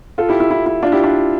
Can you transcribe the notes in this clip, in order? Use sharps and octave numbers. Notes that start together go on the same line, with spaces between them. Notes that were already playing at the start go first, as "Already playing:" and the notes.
F4 A4
E4 G4
E4
E4
E4
D4 F4
E4 G4
D4 F4